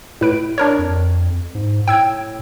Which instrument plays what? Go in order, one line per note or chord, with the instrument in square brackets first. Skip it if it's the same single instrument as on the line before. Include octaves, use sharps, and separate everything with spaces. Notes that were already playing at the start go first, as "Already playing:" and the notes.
[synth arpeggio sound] A2 B4 D7
D4 A#4 C#5
[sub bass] F2
G#2
[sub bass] A2 [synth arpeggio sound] G5 E6 G#6